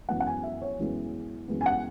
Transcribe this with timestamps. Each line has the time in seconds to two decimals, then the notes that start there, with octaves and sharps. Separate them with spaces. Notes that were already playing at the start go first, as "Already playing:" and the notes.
0.09 F#2 E3 G#3 B3 F#5
0.20 F#5
0.27 G#5
0.43 E5
0.62 C#5
0.79 F#2 E3 G#3 B3
1.48 F#2 E3 G#3 B3
1.61 G#5
1.66 F#5